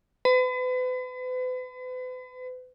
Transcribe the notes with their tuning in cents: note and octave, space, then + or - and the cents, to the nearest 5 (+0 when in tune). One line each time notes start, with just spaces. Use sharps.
B4 +40